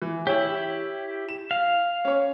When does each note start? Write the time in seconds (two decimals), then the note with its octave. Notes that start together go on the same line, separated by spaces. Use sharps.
0.02 E3
0.27 E4 G4 C#5
1.29 E7
1.51 F5
2.05 C#4 C#5